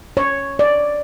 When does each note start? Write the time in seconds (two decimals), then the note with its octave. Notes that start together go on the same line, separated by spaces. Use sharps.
0.17 C#5
0.59 D5